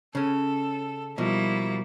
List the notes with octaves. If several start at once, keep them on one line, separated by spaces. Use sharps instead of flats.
C#3 C#4 A4
B2 F3 G3 A#3 E4